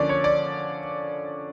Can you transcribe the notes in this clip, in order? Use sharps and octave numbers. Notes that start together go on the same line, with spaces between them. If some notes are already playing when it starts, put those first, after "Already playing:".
Already playing: D3 F3 A#3 C#4 D5
C#5
D5